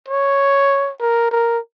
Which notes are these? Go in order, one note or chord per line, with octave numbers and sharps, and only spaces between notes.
C#5
A#4
A#4